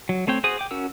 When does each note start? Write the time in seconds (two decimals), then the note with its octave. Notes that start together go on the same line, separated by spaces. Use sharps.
0.09 F#3
0.27 A3 C4 C#5 G5
0.44 F#4 G#4 C5 D#6
0.59 G5 D6
0.71 C#4 F#4 A#4 E6